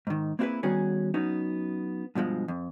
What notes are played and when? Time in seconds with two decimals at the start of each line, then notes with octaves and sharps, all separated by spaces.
0.07 G#2 D#3
0.39 A#3 C4 E4 F#4 G#4 B4
0.63 D#3 G3 B3 C#4 F#4 G#4
1.14 F#3 B3 C#4 D#4
2.15 G2 B2 F3 G#3
2.48 F2